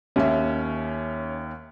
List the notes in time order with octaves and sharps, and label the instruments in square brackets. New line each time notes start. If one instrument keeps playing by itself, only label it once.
[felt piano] D#2 E5 [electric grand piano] C#4